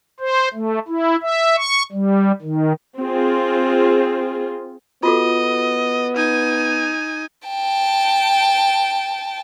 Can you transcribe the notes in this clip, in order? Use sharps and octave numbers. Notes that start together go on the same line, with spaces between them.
C5
A3
E4
E5
C#6
G3
D#3
C4 F4 G#4
B3 F4 F#4 A4 D#5
D#4 G#5
G5 A5